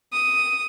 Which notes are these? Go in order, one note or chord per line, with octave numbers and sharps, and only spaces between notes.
D#6